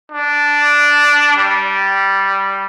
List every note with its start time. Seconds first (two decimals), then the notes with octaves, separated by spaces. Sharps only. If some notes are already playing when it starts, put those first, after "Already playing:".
0.12 D4
1.37 G3